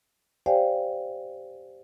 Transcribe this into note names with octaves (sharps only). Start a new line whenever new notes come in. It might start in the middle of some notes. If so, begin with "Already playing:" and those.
G4 C5 D5 F5 G5 G#5